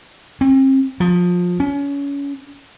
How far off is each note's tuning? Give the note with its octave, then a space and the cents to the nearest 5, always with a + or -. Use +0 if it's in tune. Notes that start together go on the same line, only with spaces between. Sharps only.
C4 +40
F3 +25
C#4 +30